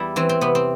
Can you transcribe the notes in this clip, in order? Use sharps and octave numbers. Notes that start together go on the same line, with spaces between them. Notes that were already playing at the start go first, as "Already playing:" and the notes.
Already playing: E2 G3 E4
E3 C4
C4
C3 B3
C4